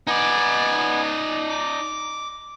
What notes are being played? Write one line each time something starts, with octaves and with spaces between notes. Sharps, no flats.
B3 D#4 D5 G#5
D6